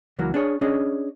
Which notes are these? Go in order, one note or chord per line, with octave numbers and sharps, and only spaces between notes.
C#2 E3 F#3 A#3 F#4
D4 G#4 C#5
C#4 D4 G#4 C#5 D#5